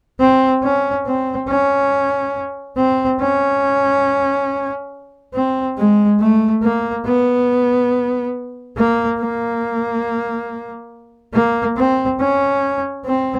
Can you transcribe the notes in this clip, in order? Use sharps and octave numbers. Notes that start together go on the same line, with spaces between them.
C4
C#4
C4
C#4
C4
C#4
C4
G#3
A3
A#3
B3
A#3
A#3
A#3
C4
C#4
C4